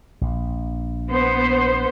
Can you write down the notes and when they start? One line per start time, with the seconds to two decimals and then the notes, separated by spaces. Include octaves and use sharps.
0.21 A#1
1.10 B3 C5